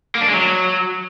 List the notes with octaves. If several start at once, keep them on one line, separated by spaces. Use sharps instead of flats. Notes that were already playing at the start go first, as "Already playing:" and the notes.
A#3
D4
G#3
F#3